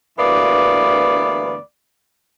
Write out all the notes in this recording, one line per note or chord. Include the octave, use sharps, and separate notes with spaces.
D2 G2 E3 A#3 B3 D5